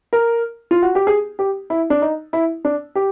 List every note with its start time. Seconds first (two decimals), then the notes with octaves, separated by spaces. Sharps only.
0.13 A#4
0.71 F4
0.82 F#4
0.95 G4
1.07 G#4
1.39 G4
1.70 E4
1.90 D4
2.02 D#4
2.33 E4
2.65 D4
2.95 G4